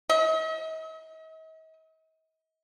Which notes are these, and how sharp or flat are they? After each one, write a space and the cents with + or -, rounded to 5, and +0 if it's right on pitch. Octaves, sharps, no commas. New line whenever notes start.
D#5 +45